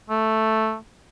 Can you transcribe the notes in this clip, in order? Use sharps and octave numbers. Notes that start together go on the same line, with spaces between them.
A3